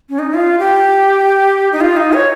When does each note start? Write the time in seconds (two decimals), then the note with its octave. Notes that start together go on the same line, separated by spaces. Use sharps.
0.10 C#4
0.19 D#4
0.34 F4
0.59 G4
1.72 D#4
1.81 F4
1.97 D#4
2.13 C#5